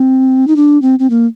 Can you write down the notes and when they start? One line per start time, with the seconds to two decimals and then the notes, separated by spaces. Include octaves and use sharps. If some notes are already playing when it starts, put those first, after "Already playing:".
Already playing: C4
0.48 D#4
0.56 D4
0.82 C4
0.99 C4
1.10 A#3